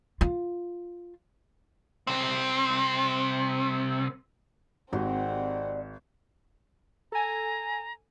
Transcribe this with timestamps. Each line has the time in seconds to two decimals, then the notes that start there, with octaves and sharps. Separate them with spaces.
0.21 F4
2.07 C2 C4
4.93 G#1 G3 G#3 C4 D#4 F#4 F#5
7.12 A4 G#5 A#5